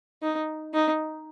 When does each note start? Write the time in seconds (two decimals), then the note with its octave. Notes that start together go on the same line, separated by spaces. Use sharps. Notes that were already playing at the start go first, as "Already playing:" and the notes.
0.22 D#4
0.74 D#4